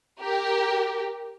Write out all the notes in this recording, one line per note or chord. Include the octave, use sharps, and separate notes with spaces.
G4 A#4